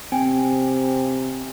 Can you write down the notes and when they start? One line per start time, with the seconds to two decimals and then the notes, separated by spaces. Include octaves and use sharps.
0.12 C3 C4 G5 G#5